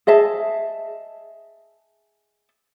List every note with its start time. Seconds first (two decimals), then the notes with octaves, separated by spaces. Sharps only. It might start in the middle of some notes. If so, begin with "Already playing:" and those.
0.07 G#4 D#5 E5 A5